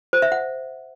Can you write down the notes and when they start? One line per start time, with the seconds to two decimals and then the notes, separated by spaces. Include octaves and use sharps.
0.13 C5
0.22 E5
0.32 F#5